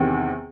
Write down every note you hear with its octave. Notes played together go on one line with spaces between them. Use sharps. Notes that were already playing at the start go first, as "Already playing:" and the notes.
Already playing: E2 C3 D#3